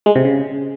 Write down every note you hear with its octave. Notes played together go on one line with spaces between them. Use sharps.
G#3
C3
C#3